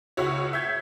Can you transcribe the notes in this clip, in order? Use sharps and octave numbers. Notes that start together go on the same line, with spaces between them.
C#2 E4 F#4 C#5
E5 G6 G#6